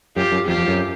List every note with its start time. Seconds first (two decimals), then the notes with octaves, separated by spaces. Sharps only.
0.16 F#2 F4 G4
0.32 F#2
0.47 F2 F4 G4
0.57 F2
0.68 F#2